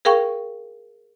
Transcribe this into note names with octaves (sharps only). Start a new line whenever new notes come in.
G#4 A#4 F5 G5 C#6